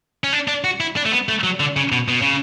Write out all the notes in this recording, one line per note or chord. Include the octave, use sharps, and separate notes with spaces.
C#4
D4
D4
F#4
E4
D4
A3
B3
A3
F#3
D3
C#3
B2
B2
C#3